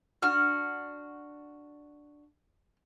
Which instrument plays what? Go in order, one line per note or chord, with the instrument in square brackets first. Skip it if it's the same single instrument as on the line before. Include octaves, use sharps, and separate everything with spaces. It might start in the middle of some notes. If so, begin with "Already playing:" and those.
[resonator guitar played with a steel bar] D4 F#4 [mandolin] F6